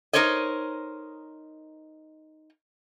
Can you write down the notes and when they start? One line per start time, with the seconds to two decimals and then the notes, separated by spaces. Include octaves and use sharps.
0.13 D#4 A#4 C5 C#5 D#5